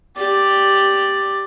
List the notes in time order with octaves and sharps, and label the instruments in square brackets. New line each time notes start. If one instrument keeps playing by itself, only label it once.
[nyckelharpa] G4 D5